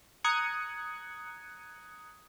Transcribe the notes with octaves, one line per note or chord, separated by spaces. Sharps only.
A#5 D#6 F#6 G#6 C#7